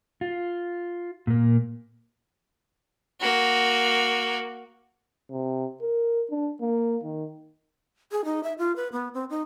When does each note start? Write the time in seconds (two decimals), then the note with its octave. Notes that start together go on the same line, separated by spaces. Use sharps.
0.21 F4
1.27 A#2 A#3
3.20 A#3 F#4
5.31 C3
5.81 A#4
6.30 D4
6.61 A#3
7.04 D#3
8.12 G#4
8.25 D#4
8.43 E5
8.59 F4
8.76 B4
8.92 B3
9.14 C4
9.30 D#4